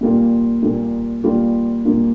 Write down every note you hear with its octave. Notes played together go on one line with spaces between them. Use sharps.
A#2 G3 A#3 F4
A#2 G3 A#3 F4
A#2 G3 A#3 F4
A#2 G3 A#3 F4